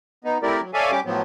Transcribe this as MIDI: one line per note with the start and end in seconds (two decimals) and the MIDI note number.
0.25 0.38 59
0.25 0.38 63
0.43 0.61 57
0.43 0.61 60
0.43 0.61 64
0.43 0.61 67
0.43 0.61 70
0.43 0.61 74
0.62 0.71 54
0.74 0.91 69
0.74 0.91 73
0.74 0.91 74
0.74 0.91 76
0.74 0.91 77
0.74 0.91 80
0.92 1.00 55
0.92 1.00 61
0.92 1.00 67
0.92 1.00 86
1.05 1.22 45
1.05 1.22 53
1.05 1.22 54
1.05 1.22 59